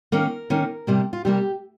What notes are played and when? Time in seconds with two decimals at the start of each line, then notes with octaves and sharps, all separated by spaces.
0.12 D#3 A#3 C#4 A#4
0.50 D#3 A#3 C#4
0.87 C3 G3 A#3
1.13 F4
1.25 C3 G3 A#3 G4